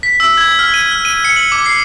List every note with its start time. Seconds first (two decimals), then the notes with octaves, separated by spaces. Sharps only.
0.03 B6
0.20 E6
0.37 G#6
0.59 F6
0.74 D#7
0.91 F6
1.05 D#7
1.25 C#7
1.36 F#7
1.52 D6
1.66 C7